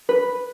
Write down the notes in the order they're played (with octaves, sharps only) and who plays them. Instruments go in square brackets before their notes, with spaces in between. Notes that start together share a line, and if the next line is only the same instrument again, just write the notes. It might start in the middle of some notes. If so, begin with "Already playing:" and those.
[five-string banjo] B4